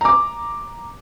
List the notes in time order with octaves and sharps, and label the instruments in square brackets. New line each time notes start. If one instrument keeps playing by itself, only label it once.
[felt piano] A#5 D6